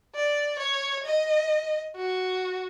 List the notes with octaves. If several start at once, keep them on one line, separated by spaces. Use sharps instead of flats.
D5
C#5
D#5
F#4